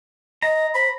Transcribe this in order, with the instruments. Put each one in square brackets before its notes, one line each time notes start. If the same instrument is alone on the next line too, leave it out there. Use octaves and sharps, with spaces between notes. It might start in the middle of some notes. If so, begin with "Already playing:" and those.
[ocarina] D#5 [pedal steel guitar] A#5
[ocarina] C5 [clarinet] B5